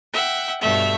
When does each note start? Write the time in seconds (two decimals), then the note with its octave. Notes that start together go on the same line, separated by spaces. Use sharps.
0.13 E5 F#5 G5
0.60 G2 B2 A3 E5